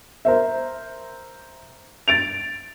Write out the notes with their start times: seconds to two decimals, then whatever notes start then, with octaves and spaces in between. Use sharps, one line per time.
0.25 A#4 C5 E5
2.08 A6 D7 F7